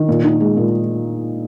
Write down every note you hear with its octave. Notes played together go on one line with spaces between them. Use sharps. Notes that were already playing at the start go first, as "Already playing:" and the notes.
Already playing: D#3
A#2
D#4
G#3
A#2